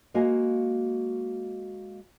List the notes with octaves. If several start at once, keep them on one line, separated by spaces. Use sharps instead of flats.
G#3 A#3 F#4 D#5 F5 G#5